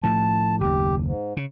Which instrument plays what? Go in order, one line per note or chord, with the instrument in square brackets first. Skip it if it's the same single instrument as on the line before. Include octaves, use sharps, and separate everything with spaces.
[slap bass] A2 F3 A3 [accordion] A5
[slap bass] F#1 D#2 [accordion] G4
[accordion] G#2
[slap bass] C#3